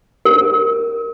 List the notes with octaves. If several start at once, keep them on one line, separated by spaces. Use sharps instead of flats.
A#4